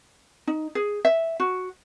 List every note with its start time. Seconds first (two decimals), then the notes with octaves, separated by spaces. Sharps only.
0.47 D#4
0.75 G#4
1.05 E5
1.40 F#4